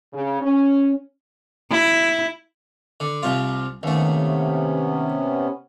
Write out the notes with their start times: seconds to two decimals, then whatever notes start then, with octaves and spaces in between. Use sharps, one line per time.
0.13 C#3
0.41 C#4
1.71 E4
3.00 D3
3.23 C2 C3 F4
3.83 D#2 C3 A3 B3 C#4